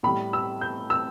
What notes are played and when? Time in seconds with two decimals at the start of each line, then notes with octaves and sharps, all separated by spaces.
0.03 A2 G3 B5
0.33 E6
0.61 G6
0.90 E6